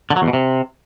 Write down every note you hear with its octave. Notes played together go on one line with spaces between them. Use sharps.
D3
F#3
E2
B2
C3